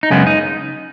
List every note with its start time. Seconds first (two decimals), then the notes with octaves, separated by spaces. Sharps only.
0.03 D#4
0.10 F#2 C#3 G#3 B3 C#4
0.27 D#4